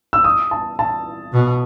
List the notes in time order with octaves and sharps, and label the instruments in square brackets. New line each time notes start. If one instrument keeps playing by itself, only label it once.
[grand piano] E6
D#6
A5
A5
[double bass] B2